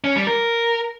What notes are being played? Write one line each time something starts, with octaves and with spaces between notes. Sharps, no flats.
C#4
G3
A#4